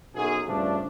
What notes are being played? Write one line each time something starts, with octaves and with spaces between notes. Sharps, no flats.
B1 F#2 G#4
G2 C#3 F3 A3 D4